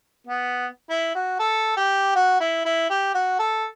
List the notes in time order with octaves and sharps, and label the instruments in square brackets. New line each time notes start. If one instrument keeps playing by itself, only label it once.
[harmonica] B3
E4
F#4
A4
G4
F#4
E4
E4
G4
F#4
A4